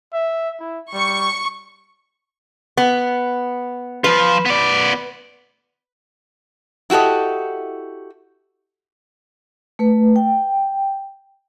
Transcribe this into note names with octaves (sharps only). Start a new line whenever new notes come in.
E5
E4
G3 C#6
B3
F3 F4 B4
B3 D5
E4 F#4 G4 A4 D#5
A3 B4
G5